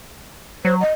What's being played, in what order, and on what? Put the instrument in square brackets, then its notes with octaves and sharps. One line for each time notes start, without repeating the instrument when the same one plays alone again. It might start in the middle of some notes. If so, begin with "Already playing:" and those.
[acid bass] F#3 [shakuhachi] C5
[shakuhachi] D#5